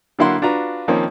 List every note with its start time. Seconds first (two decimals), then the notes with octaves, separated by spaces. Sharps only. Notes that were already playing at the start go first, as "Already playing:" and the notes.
0.19 D3 F#3 A#3 E4 F#5 C6
0.42 D4 F4 F#4 B4 A#5
0.88 D#3 F3 A#3 C4 C#4